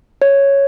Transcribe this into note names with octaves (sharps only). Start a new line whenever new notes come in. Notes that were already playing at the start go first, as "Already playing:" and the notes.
C#5